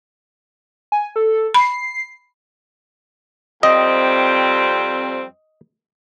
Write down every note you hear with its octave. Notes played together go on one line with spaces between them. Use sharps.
G#5
A4
B5 C7
F2 G3 C4 D#5